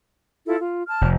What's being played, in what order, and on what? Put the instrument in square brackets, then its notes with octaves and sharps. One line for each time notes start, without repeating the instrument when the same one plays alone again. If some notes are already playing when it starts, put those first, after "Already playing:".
[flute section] E4 F4 A4
F4
A5 F6
[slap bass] F1